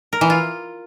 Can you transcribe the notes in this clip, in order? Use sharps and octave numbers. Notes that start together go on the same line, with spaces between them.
A#4
E3
F4